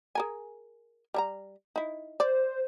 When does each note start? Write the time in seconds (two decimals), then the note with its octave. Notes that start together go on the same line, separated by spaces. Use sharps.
0.15 G#4 A#4 G#5
1.14 G3 A#4 A#5
1.76 D#4 E4
2.20 C5 D5